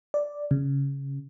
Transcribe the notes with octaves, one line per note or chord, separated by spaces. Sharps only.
D5
C#3